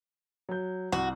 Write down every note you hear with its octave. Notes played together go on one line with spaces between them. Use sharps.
F#3 G6
C2 F#4